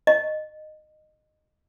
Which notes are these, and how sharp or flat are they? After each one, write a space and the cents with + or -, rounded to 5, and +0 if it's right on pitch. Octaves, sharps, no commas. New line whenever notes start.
D#5 -15